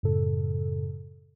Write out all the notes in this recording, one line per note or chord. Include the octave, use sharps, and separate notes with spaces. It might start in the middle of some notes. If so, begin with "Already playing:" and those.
F#2 A2 C#3 A4